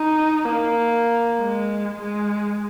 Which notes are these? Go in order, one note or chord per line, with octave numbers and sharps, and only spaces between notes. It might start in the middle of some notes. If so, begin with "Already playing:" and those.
Already playing: D#4
A#3
G#3
G#3